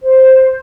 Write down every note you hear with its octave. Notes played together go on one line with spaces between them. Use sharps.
C5